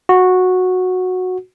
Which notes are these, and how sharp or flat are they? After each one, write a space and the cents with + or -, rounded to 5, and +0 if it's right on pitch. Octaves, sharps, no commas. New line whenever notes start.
F#4 -10